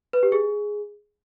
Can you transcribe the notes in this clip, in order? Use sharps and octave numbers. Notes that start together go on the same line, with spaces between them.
B4
G4
G#4